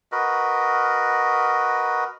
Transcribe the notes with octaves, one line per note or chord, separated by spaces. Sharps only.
F#4 A#4 B4 D#5